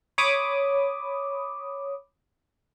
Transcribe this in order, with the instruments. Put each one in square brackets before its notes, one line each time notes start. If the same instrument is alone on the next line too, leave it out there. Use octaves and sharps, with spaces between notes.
[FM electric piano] C#5 B5 D6 D#6